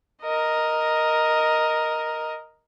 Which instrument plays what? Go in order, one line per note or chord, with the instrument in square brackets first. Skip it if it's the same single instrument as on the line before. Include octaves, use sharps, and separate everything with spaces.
[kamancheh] A#4 D#5